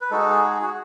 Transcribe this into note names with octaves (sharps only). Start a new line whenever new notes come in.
B4
G#3 D#4 F#4 A4
G#4
G#4
F#4